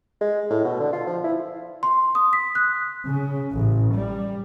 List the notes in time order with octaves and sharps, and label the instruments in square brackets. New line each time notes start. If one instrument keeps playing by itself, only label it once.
[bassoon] G#3
A2
B2
D3
F4
F3
E4
[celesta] C6
D#6
B6
F#6
[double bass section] C#3
A1
G3